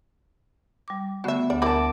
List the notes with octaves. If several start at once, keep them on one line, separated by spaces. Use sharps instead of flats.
G3 D6
D3 A3 B3 F#4 E5
D2 D5 F#5
E4 A#4 A5 B5 D6